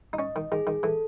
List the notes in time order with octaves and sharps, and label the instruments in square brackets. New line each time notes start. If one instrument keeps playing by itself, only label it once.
[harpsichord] D#4
[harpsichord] C#4 [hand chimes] D#5
[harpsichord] D#3
[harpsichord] D#3 [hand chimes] G#4
[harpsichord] D#3
[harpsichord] E3 [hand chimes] A4